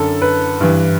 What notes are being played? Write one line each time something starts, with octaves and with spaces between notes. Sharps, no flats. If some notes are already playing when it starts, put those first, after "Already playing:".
Already playing: F#2 D3 A4
B4
G2 E3